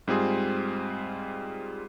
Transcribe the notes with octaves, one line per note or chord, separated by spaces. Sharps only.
G#2 G3 C4 F4 G#4